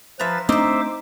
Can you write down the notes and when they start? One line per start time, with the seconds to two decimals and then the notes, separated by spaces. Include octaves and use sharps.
0.19 F3 B4 E5 A#5 A6
0.49 A3 C4 D4 D#4 C5 D#5 E5 D6